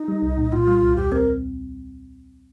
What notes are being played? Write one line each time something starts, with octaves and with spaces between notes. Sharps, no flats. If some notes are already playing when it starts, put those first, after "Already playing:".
Already playing: D#4
G3
C2
A#2
A#2 F4
G3
C2
D#2 G4
C4 A#4